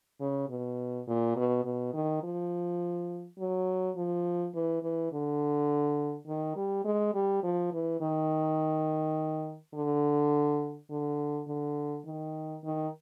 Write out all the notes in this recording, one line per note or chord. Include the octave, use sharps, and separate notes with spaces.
C#3
B2
A#2
B2
B2
D#3
F3
F#3
F3
E3
E3
D3
D#3
G3
G#3
G3
F3
E3
D#3
D3
D3
D3
D#3
D#3